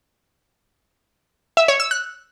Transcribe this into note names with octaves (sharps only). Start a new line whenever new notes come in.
E5
C#5
E6
F#6